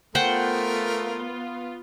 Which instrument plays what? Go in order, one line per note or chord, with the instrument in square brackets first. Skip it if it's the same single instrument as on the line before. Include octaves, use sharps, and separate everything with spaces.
[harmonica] A3 A#4 [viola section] B3 F4 [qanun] C5 F#5 G5